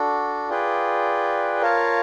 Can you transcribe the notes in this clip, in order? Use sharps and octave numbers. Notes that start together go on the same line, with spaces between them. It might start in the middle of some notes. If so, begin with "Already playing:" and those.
Already playing: D4 F#4 A4
F4 G#4 B4 D5 G5
F4 A#4 C#5 F5 A5